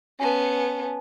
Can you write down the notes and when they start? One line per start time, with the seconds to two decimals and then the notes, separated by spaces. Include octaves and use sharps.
0.20 B3 C#4 G#5 A5